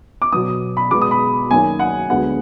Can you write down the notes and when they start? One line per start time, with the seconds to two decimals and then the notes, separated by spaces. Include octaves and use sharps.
0.22 D6
0.32 B2 F#3 B3 D#6
0.77 B5
0.91 B2 G#3 B3 D6
1.01 D#6
1.11 B5
1.51 F#2 D#3 F#3 A#3 G#5
1.79 F#5
2.09 D2 D3 G#3 B3 F#5